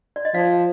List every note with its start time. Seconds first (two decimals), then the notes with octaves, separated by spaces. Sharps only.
0.16 D5
0.25 D#5
0.34 F3 D5 F5